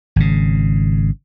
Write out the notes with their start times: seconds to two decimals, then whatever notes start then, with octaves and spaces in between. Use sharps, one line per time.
0.16 G#1 C#3